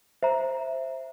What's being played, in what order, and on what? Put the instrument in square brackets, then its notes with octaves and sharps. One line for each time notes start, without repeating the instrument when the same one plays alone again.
[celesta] C5 E5 A#5